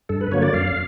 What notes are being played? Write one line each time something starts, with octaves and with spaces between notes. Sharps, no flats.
G2 A4
B4
D3 F#3 A#3 C#5
D5
F#2 F5